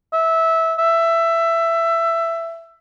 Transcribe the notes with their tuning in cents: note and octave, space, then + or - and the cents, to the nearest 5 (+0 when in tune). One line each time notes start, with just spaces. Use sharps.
E5 -15
E5 +15